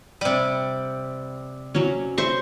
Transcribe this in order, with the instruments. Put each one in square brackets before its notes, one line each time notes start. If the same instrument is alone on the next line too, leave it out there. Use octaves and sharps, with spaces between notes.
[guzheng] C3 G3
[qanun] F#3 C#4
C5 E5 C#6